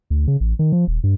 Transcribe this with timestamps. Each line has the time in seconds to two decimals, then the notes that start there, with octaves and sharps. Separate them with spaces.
0.10 D2
0.27 C#3
0.41 A1
0.59 D#3
0.72 F3
0.87 D#1
1.04 G2